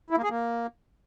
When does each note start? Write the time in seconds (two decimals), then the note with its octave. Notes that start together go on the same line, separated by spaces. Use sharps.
0.10 E4
0.17 A#3
0.23 G#4
0.30 A#3